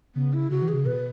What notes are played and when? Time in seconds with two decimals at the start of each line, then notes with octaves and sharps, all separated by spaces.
0.15 C#3 B3
0.33 E4
0.50 C#3 F#4
0.62 E3
0.68 G#4
0.73 C#3
0.85 B2 B4